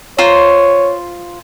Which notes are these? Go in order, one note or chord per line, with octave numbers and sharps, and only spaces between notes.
F4 C5 C#5 A#5